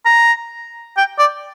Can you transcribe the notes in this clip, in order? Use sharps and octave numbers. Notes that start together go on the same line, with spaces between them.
A#5
G5
D5